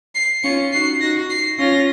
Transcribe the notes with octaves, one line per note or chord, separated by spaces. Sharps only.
C7
C#4 F4 C#7
D#4 F#4 C7
D#4 F#4 A#6
C7
C#4 F4 A#6